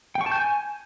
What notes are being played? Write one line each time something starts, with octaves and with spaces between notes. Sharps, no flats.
G5
C#6
A5
G6
G#5